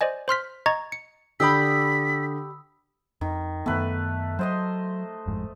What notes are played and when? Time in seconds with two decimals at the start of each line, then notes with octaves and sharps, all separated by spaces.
0.01 C5 D5 D#5 G#5
0.28 C5 C6 F6 B6
0.66 D#5 A#5 C#6 G#6 A6
0.92 C#7
1.40 D3 G4 D5 G5 B5 D#6 E6 B6
3.21 F2 D#3
3.66 F#2 D#3 A3 B3 B4
4.39 F#3 C5 D#5 C6
5.26 G1 F2 G#2